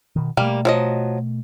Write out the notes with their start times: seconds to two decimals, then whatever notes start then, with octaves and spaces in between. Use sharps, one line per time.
0.16 B2 D#3
0.37 B2 G3 A3 A#3
0.65 F3 F#3 D#5